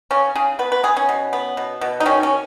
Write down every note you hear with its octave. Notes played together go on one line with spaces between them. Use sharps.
C#3 C#4
C#3 G#4
B3 B4
B4
B3 G#4
C#4
B2
B3
B2
B2
D#4
D#3 C#4
C#4